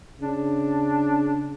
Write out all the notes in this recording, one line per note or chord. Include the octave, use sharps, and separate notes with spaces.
C#3 D4